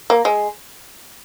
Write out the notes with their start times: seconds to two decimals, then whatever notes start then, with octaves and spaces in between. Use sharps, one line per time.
0.10 A#3
0.25 G#3